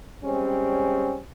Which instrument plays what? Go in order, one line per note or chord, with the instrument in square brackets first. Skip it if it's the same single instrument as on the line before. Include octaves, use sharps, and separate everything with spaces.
[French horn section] G3 G#3 C4 C#4